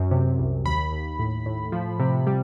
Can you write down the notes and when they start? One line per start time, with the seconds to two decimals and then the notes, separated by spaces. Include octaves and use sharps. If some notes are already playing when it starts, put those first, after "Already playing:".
Already playing: F#2
0.11 C3
0.39 C2
0.65 D#2 B5
0.92 D#2
1.19 A2
1.46 A2
1.72 F3
2.00 C3
2.27 G3